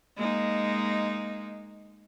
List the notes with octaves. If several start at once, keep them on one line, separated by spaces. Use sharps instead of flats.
G#3 A#3 D#4